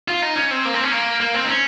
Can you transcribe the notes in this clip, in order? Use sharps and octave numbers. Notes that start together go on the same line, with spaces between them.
F4
D#4
C#4
C4
A#3
C4
C#4
A#3
A#3
C4
D#4
C#4